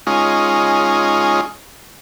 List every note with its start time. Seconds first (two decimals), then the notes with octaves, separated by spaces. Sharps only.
0.07 G#3 C#4 D#4 F4